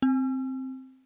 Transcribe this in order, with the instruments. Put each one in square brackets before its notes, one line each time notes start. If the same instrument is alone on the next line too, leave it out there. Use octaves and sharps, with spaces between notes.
[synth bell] C4